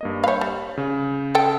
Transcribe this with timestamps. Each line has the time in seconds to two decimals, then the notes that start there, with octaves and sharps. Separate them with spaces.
0.01 G2 A#3 D#5
0.24 C#5 F5 B5 G6
0.41 G3
0.77 C#3
1.35 A4 G5